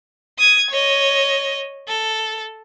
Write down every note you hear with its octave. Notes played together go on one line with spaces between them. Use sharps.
D#6 G#6
C#5 D#5
A4